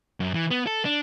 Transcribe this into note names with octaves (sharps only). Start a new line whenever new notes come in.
F#2
E3
B3
A4
D4